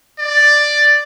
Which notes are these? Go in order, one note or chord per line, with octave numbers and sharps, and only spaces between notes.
D5